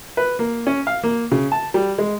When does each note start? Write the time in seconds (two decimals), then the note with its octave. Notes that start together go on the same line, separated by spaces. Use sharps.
0.17 B4
0.39 A#3
0.67 C#4
0.87 F5
1.03 A#3
1.32 C#3
1.52 A5
1.74 G3
1.98 G#3